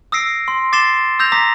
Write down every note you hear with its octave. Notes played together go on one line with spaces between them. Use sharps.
D#6 E6 A#6 C7 D7
C6
D6 A6 C7 E7 G7
D#6 E6 G6 A#6 F7
A#5 D6 D#6 A#6 B6